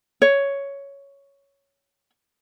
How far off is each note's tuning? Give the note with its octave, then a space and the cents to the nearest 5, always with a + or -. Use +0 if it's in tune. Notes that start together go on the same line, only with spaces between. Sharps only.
C#5 +5